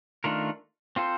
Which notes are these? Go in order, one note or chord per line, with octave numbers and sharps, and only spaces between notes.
D#3 A3 D4 F4 A#4
C4 F4 A4 C5